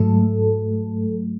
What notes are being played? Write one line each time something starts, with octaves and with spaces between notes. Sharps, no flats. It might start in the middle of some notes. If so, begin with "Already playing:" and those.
Already playing: G#2 F#3 A3 A4